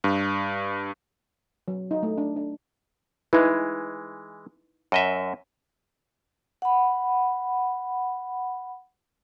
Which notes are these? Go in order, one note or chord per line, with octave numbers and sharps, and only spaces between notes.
G2
F#3
D#4
A3
D4
D4
E3 G#3 D#4 E4 B4
F#2 D#5 E5
F#5 B5